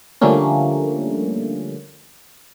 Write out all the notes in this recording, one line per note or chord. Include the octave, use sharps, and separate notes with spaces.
D3 F3 G3 A3 A#3 C#4